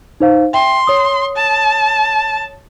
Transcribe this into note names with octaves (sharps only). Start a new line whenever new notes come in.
D#4 C5 F5
E5 G5 C6
C#5 D#6
A5